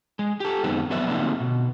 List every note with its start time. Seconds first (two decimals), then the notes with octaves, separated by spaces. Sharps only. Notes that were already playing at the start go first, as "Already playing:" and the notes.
0.19 G#3
0.40 G4 A4
0.63 F#2 D#3 G#3 B3 C4
0.90 F2 F#3 B3 B4 D5 E5
1.09 D3 F#3 A3 A#3 C4 D#4
1.40 B2